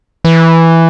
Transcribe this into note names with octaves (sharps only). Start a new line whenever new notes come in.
E3